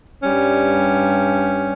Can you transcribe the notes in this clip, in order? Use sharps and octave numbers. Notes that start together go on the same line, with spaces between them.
G2 G3 C#4